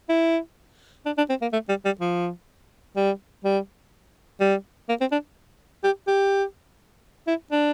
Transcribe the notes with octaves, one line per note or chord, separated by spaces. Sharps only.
E4
D4
D4
C4
A#3
A3
G3
G3
F3
G3
G3
G3
A#3
C4
D4
G4
G4
E4
D4